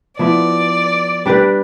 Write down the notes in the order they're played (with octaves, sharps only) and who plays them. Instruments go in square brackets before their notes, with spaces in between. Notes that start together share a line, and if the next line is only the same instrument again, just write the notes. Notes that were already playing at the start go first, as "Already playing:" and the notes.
[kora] F3 B3 E4 [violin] D5
[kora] G3 D4 G4 B4